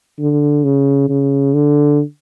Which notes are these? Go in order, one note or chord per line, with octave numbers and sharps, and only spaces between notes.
D3
C#3
C#3
D3